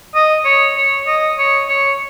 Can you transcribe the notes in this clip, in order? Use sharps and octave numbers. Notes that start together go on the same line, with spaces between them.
D#5
C#5
C#5
D#5
C#5
C#5